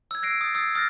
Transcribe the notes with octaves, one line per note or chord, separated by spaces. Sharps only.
E6 G#6
F#6 A#6 C7 D7
D#6 A6
D#6 E6 G#6 C7
D#6 F6 F#6 A6 A#6